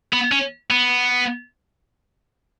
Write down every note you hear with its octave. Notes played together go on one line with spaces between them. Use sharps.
B3
C#4
B3